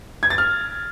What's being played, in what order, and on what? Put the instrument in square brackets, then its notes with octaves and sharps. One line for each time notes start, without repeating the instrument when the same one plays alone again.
[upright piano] G#6
A6
F6